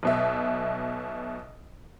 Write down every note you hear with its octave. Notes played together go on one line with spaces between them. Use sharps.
B1 B2 E5